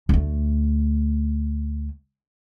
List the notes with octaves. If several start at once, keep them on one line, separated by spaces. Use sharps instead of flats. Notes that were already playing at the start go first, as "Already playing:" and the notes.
D2 A3